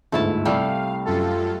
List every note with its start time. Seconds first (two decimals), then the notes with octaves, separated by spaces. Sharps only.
0.12 G1 D2 G#2 A3 E4 A5
0.45 C2 G3 A3 F5
1.05 F#2 F4 A4